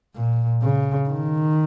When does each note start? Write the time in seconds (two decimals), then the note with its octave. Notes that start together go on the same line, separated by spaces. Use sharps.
0.15 A#2
0.63 C#3
1.09 D#3